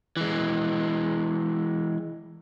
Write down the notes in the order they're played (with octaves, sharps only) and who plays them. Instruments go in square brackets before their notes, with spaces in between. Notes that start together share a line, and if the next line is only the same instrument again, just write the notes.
[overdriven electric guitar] E3 G#3